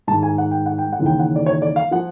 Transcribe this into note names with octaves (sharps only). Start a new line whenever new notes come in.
G#2 D#3 A5
G#5
F#5
G5
F#5
G5
F#5
D#2 C#3 E3
G5
F#5
D5
C#5
D5
F5
F3 F#5